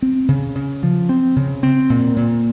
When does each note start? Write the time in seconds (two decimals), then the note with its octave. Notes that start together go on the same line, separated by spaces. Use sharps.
0.02 C4
0.29 C#3
0.55 C#3
0.83 F3
1.09 C4
1.36 C#3
1.63 C4
1.90 A#2
2.17 A#2